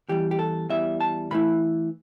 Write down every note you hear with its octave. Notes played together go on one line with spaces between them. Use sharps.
E2 E3 G3 G4
G4
A4
E2 E3 G3 E5
A5
G2 E3 A3 E4 B5